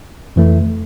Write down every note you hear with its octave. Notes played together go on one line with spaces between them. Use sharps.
F2 E3 A3